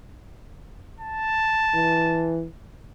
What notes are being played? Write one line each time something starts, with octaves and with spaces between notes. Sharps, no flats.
A5
E3